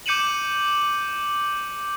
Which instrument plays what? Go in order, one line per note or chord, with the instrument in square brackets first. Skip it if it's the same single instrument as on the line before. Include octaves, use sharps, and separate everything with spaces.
[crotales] D6 G6 C#7 D#7 E7 F#7